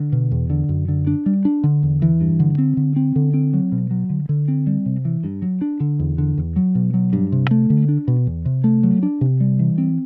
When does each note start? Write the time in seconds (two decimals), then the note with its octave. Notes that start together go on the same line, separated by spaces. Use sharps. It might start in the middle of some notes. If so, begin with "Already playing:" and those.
Already playing: D3
0.12 B2
0.31 E2
0.50 D3
0.69 F#2
0.88 D3
1.07 D4
1.26 G3
1.45 D4
1.64 D3
1.83 E2
2.02 E3
2.21 G2
2.40 D3
2.58 C4
2.77 D3
2.96 C4
3.16 D3
3.34 C4
3.54 F#3
3.72 B2
3.91 F#3
4.10 D3
4.29 D3
4.48 C4
4.67 G3
4.86 C3
5.05 E3
5.24 G2
5.42 F#3
5.61 D4
5.80 D3
5.99 E2
6.18 D3
6.38 E2
6.56 F#3
6.75 B2
6.94 F#3
7.13 G2
7.32 C3
7.51 A3
7.70 D3
7.89 D4
8.08 B2
8.27 E2
8.45 C3
8.64 A3
8.83 F#3
9.03 D4
9.21 C3
9.40 G3
9.59 E3
9.78 C4